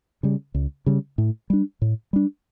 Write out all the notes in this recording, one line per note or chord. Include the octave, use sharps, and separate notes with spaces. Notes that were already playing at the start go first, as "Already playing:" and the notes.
C#3 G3
C#2
C#3 G3
A2
G3 D4
A2
G3 D4